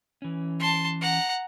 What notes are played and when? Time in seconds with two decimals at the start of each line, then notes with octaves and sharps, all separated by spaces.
0.22 E3 C#4
0.60 A5 C6
1.01 F#5 A#5